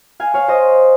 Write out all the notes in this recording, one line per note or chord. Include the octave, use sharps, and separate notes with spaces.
F5 G#5
C#5 F5
C5 D#5